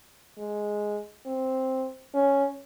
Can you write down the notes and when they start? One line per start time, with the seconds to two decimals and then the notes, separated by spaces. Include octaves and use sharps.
0.38 G#3
1.26 C4
2.15 C#4